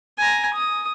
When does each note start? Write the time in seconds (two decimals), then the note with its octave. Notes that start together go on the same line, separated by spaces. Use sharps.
0.18 G#5 A#5
0.54 D#6